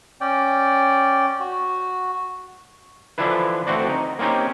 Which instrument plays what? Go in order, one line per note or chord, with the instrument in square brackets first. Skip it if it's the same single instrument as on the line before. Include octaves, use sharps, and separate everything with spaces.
[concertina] C#4 D5 G5
F#4
[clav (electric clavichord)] D3 E3 F3 D4 E4 B4
D2 A3 C4 F#4 D5
D#4
A#3 C4 C#4 D#4 G4